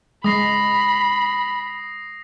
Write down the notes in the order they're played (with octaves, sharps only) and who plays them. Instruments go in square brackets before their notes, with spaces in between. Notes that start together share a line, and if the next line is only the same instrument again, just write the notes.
[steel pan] G#3 [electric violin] B5 [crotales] D#6 A#6 C7